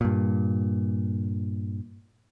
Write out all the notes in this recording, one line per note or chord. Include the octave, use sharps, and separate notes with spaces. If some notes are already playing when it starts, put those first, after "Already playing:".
G2 A#2